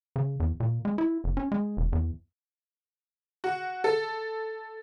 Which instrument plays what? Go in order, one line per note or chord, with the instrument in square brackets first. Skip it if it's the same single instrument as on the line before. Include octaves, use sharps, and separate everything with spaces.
[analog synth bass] C#3
E2
A#2
G#3
E4
F#1
C#4
G#3
E1
E2
[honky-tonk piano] F#4
A4